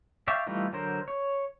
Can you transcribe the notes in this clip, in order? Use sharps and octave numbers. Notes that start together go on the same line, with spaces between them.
D5 E5 F5 G5 C#6
E3 G3 A3 D#4 F4
D3 F#3 A#4 C5
C#5